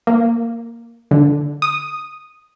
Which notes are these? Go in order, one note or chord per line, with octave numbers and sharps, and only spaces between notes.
A#3
D3
D#6